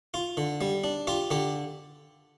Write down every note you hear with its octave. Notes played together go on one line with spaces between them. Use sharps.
F4
D3
G3
D4
F4 G4
D3 G4